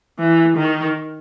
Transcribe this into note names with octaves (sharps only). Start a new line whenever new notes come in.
E3
D#3